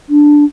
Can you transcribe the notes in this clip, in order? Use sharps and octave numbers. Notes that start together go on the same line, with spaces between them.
D4